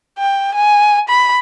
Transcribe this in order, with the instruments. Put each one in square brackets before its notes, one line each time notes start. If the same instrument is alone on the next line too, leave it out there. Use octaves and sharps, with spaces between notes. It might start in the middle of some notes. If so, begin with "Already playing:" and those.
[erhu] G5
G#5
B5